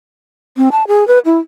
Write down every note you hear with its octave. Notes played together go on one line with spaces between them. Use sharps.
C4
A5
G#4
B4
E4